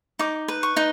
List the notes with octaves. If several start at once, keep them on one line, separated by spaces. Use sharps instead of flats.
D#4 D6
B4
C#6
D#4